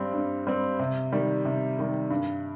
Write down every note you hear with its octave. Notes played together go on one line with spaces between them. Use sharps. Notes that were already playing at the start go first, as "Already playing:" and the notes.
Already playing: G2 G3 C4
G2
G3 C4
C3
D#3 G3
C3
D#3 G3
G2